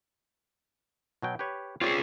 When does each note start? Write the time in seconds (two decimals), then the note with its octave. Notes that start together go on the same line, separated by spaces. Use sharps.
1.22 B2 F#3 G5
1.39 G4 B4 C#5
1.82 C4 F4 G4 G#4 C#5 D5